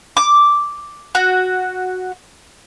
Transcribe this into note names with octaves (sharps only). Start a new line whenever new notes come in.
D6
F#4